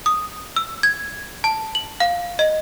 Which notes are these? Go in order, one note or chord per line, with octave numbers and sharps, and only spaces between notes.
D#6
E6
G#6
A5
F#7
F5
D#5